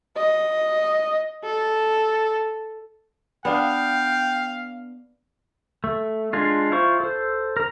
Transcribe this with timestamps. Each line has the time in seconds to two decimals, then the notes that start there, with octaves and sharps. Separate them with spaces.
0.17 D#5
1.44 A4
3.45 B3 D4 F5 G5
5.84 A3
6.33 G#3 D4 F4
6.72 E4 F4 C5 C#6
7.00 A4 C5
7.57 A#4 A#5